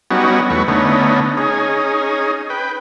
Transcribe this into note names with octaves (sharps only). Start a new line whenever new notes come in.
F#3 G3 B3 C#4 D#4 F#4
E2 F#3 A3 B4 C#6
D3 A3 B3 C#4 D#4
C#4 D#4 G#4
B4 G5